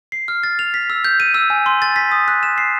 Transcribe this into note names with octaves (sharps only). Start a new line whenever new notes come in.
C7
F6
A6
F7
B6
E6
G6
D#7
E6
G#5
C6
A6
B6
D#6
F#6
E7
C7